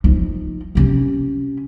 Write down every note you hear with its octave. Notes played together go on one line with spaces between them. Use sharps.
F3 D#4
C3 C#4